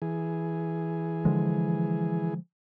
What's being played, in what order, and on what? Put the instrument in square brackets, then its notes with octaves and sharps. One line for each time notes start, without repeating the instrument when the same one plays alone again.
[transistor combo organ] E3 G#4
[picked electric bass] D3 F3 G#3